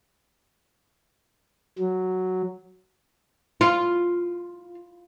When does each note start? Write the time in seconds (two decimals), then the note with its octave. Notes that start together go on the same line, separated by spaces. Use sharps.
1.78 F#3
3.61 F4